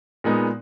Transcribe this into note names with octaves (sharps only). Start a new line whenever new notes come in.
A#2 G#3 B3 D#4